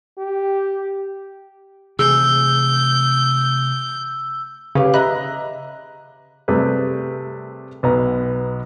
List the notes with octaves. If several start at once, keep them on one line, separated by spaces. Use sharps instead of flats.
G4
C3 E3 A3 G#4 E6 G6
C#3 G4 B4 F5
D#5 E5 A#5 B5 F#6
C3 G3 A3 G4 G#4 B4
B1 B3 A#5